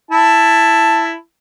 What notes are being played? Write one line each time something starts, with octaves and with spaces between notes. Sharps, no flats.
E4 A5